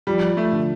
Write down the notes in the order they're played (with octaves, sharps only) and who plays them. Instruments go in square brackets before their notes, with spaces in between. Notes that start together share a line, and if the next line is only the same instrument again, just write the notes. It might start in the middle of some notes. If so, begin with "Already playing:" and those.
[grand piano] F3 [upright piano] G3
[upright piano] A3
[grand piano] D3